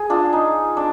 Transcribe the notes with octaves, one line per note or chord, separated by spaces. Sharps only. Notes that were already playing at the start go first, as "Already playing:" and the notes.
Already playing: G#4
D4 F4
D#4
D4